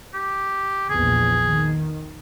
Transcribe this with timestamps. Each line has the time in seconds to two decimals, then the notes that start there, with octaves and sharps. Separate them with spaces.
0.14 G4
0.90 A#1 E2 G#4
1.47 D#3